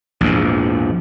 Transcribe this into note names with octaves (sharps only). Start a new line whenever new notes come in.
A#1 E2 G#2